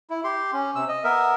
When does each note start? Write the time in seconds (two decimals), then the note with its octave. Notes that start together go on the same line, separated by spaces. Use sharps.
0.10 E4
0.24 G4 C6
0.53 C#4
0.75 C3 E6
0.89 D#5
1.04 B3 A#4 E5